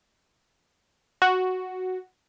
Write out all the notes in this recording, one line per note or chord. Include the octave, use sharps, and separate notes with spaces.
F#4